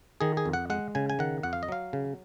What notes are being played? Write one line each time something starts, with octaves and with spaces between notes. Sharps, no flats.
D#3 G#4
G#4
F2
F#5
G#3 F#5
C#3 G#5
G#5
D#3 F#5
F2 F#5
F5
D#5
F#3 F5
C#3